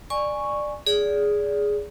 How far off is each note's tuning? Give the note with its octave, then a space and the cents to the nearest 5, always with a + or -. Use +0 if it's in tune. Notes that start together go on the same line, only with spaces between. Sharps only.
D5 +15 G#5 +0 C#6 -5
G#4 +0 D5 -25